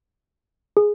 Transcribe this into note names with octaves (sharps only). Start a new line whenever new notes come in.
G#4